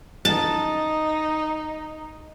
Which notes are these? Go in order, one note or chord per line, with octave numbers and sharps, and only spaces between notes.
D#4 A5